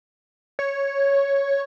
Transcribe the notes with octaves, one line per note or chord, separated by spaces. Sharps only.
C#5